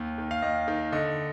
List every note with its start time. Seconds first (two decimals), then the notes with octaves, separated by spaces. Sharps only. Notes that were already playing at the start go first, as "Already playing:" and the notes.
Already playing: D#2
0.18 D#3
0.31 F5
0.42 D#2 D#5
0.68 D#3
0.92 D3 D#5